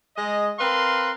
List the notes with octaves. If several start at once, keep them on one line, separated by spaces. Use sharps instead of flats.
G#3 D#5
C4 A#4 B4 F5 C6